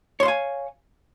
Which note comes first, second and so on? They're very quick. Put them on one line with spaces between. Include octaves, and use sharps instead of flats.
C#5 C6 F5 G#5